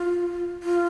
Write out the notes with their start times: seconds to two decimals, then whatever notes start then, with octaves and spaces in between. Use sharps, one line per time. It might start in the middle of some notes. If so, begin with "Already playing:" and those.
Already playing: F4
0.63 F4